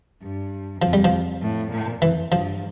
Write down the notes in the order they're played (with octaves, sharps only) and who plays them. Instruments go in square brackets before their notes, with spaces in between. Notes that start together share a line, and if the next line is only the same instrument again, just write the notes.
[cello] G2
[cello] F2 [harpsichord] F3
[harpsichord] G3
F3
[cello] A2
A#2
[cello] F2 [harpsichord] E3
[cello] G2 [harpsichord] F3